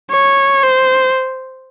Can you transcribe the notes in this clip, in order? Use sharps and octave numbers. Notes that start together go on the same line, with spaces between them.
C#5
C5